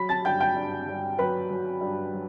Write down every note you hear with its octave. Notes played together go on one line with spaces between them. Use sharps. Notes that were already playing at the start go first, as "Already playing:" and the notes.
Already playing: F#3 B5 B6
A5 A6
G2 G5 G6
G5 G6
G2
G2
F#3 B4 B5
F#3
G2
F#3